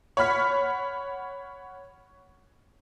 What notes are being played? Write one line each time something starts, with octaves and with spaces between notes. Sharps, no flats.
C#5 F#5 B5 F6 B6